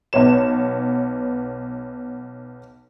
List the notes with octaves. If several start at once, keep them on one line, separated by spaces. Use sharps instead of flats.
B1 B3 C#5 E7